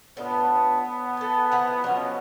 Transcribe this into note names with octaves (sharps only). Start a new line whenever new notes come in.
A2 B3 D4 F4
A4 G#5
F3 E4 F#5 A#5
B2 F3 F#3 C#4